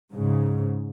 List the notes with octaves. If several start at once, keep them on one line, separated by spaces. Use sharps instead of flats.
G#2 C#3